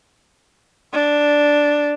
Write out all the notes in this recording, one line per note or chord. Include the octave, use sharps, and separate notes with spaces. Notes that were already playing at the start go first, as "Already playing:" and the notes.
D4